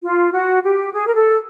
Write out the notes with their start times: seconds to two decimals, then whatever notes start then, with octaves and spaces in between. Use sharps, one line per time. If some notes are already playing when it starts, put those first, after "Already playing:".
0.02 F4
0.32 F#4
0.63 G4
0.92 G#4
1.08 A#4
1.15 A4